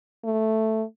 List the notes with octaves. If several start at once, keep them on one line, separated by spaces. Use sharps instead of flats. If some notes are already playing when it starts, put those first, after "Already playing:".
A3